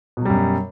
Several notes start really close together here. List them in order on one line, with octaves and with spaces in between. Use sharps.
B2 F#3 G3 F#2